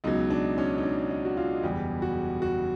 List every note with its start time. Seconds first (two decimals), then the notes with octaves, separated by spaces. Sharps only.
0.04 C#2 B2 F#3 D#4
0.30 D4
0.58 C#4
0.78 D#4
0.83 D4
1.10 D#4
1.25 F#4
1.37 F4
1.63 F#1 E2 B2 G3 G4
2.02 F#4
2.42 F#4